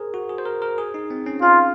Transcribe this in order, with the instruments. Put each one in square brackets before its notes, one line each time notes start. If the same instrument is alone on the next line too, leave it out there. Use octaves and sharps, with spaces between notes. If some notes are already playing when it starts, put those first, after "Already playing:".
Already playing: [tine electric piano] G#4 A#4 C5
F#4
G#4
C5
A#4
A#4
G#4
D#4
C4
C#4
[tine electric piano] C#4 [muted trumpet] F4